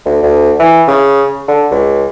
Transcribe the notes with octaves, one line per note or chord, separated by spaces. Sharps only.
D2
D2
E3
C#3
D3
C#2